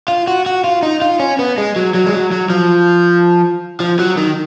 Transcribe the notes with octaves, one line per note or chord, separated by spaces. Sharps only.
F4
F#4
F#4
F4
D#4
F4
C#4
B3
G#3
F#3
F#3
G#3
F#3
F#3
F3
F3
F#3
D#3